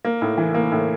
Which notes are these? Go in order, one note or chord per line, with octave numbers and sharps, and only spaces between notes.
A#3
A2
E3
A#3
A2